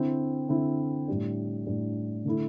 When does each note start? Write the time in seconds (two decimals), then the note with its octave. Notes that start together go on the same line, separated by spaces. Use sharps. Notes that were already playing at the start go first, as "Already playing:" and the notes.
Already playing: D3 C4 E4
0.49 D3 C4 E4
1.08 A2 G3 D4
1.66 A2 G3 D4
2.25 D3 A3 E4